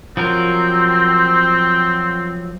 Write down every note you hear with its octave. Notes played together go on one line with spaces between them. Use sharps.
F3 F#3 C4 A#4